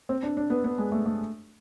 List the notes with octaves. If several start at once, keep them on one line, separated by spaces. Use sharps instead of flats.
C4
D4
D4
B3
B3
G#3
A3
A3